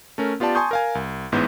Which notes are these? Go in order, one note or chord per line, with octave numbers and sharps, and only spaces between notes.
A3 C#4 A#4
B3 F4 G4 D5 A5
G#5 A5 C6 C#6 D#6 G6
A#4 F5 G#5
C2
A1 G#2 B3 E4 G6